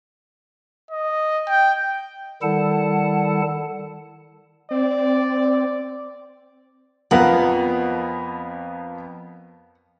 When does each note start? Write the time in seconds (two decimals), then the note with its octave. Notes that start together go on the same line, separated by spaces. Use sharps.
0.91 D#5
1.48 G5
2.42 D#3 G3 E4 A4 F#5 A5
4.71 C4 D5
7.11 F2 F3 B3 A#4 F5 F#5